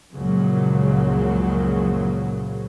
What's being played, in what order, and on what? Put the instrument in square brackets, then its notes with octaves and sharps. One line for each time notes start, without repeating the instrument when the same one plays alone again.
[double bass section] C#2 F#2 A#2 C#3 F3 F#3